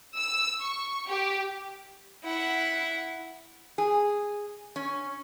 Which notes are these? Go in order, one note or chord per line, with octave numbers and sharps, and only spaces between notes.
E6
C#6
G4
E4 F#5
G#4
C#4